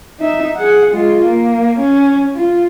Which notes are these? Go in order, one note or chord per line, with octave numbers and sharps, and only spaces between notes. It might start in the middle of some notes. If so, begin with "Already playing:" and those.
D#4 E5
G#4 F#5
G#3 F4
A#3
C#4
F4